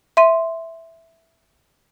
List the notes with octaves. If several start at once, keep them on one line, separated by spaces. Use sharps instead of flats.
E5 C6 D#7